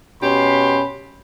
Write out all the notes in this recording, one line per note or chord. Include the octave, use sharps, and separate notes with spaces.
B2 C#4 G4 B5 C6